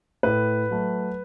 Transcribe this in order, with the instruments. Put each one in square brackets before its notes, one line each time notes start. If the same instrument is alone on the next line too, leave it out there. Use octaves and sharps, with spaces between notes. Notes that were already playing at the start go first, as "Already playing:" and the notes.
[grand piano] A2 B4
F#3 A3